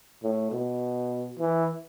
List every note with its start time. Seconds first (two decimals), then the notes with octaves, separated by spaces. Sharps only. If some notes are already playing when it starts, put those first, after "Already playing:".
0.23 A2
0.52 B2
1.39 E3